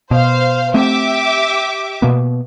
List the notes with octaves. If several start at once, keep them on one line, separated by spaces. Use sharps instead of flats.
B2 C5 F5
A3 C4 G4 E5 D6
B2 A#3 B3